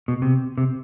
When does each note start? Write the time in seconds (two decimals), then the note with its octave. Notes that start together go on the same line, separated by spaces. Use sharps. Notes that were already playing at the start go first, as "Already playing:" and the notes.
0.08 B2
0.22 C3
0.58 C3